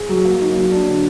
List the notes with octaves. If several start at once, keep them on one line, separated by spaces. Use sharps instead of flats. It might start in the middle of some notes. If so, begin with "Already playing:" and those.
Already playing: G#4
F#3
A#3
D#4
F#3
D4
D3